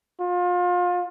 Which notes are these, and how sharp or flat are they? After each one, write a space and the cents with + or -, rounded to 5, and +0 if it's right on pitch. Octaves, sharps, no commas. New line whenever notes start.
F4 +30